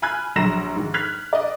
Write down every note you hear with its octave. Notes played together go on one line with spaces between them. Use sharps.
G#5 B5 F6 F#6 G#6
A#1 F#3 A#5 A#6 E7
G#2 D#3
F6 F#6 G#6 B6 F7
D5 D#5